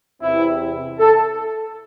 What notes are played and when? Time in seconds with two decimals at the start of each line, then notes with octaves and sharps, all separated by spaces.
0.21 E2 C3 E3 C4 E4
0.99 A4